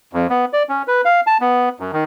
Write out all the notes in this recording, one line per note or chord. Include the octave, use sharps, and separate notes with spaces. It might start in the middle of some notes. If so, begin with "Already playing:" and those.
F2
B3
D5
C#4
B4
F5
A5
B3
F#2
D#3